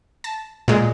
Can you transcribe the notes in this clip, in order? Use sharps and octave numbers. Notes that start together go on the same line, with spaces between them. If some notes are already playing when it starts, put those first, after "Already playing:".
A5
A#2 G#3